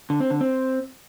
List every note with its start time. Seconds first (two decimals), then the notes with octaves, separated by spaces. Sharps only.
0.10 D3
0.20 C4
0.30 D3
0.41 C4